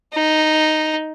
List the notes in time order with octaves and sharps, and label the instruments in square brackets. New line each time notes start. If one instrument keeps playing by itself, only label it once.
[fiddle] D#4